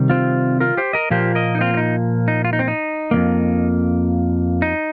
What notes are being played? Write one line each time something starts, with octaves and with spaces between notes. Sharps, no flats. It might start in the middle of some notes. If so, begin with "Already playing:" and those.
Already playing: C3 D#3 G3
C4 F4
F4 A#4
G4 C5
A#4 D#5
A#2 F3 A#3 G4 C5
A#4 D#5
D#4
C4 F4
C4
D#4
D#4
F4
D#4
C4
D#4
F2 D#3 A#3
D#4